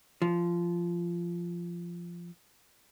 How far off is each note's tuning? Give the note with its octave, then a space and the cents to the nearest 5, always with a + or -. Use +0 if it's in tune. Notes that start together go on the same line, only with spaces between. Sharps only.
F3 -15